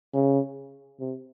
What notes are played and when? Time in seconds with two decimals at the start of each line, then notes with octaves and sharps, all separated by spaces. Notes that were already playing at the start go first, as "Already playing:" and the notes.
0.14 C#3
1.00 C3